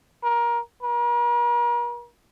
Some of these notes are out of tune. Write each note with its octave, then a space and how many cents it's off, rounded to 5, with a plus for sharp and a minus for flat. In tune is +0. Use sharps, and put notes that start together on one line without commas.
A#4 +20
A#4 +45